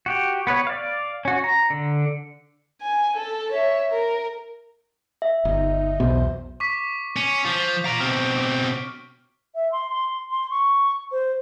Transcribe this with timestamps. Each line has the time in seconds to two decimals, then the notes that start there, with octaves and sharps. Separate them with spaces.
0.06 F#4 G4
0.47 B3 B4 C#5
0.67 D5 F5
1.25 C#4 F#4
1.44 A#5
1.70 D3
2.82 G#5
3.16 A4
3.53 C#5 E5
3.91 A#4
5.22 E5
5.45 G1 D#4
6.00 B1 E2 B2 C5
6.60 C#6 D6 B6
7.16 C#4
7.45 F3
7.85 F4 A#5 D7
8.00 B2 C4 F6
9.55 E5
9.72 C6
9.90 C6
10.31 C6
10.51 C#6
11.12 C5